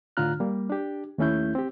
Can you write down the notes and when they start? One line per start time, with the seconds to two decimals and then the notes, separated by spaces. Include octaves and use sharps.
0.17 A2 D3 F4 A#5 F6 F#6
0.40 G3 A#3
0.70 D4 G4
1.18 D#2 A3 C#4 E4 G6
1.55 C4 G4